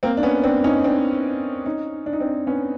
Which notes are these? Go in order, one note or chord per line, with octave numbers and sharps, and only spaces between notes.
A#3 C4
D4
B3 C#4
C4 D4
C#4 D#4
C4 D4
C#4 D#4
D4
D#4
C4 D4
B3 C#4